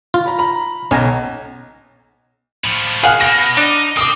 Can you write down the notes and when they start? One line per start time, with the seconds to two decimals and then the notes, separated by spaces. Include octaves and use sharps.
0.14 F4
0.26 A#5 B5
0.39 A#5 B5
0.91 B1 C#4 G#5 A#5
2.64 A2 F3
3.03 G#4 F5 F#5 F6
3.21 B2 A#6
3.57 D4 D#4
3.97 C4 D6 D#6